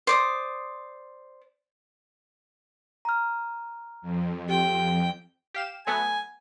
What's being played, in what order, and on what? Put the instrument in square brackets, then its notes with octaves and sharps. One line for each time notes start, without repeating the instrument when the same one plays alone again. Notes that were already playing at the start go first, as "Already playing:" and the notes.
[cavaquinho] C5 D5 D#6
[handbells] A#5 F6
[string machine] F2
[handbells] G4 [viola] G5
[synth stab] G4 F5 E7
[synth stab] F#3 A3 B3 [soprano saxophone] G#5